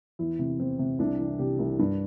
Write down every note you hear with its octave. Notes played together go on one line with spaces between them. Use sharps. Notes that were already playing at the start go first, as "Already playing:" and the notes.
E2 E4
C3
E2 C4
C3
C2 D4
E3
C3 G4
C2
G2